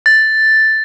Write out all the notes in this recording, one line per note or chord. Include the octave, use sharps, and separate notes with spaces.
A6